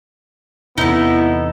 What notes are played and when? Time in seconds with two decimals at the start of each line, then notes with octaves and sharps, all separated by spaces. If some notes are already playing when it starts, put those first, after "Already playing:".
0.78 E2 C3 E3 B3 D#4 E4 A4